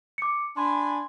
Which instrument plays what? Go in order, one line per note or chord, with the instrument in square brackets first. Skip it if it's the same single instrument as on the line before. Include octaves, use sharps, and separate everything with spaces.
[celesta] D6 C#7
[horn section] D4 G#5 B5 [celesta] C6